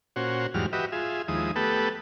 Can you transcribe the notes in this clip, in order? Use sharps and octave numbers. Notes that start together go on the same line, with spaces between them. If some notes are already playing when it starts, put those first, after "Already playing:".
A#2 C#4 F#4 C5
E2 G#2 F#3 G3 F6
F#4 G4 B4 D#5 E5
F4 G#4 E5
D#2 F3 G#3 E4 D#6
A3 B3 G4 A4 B4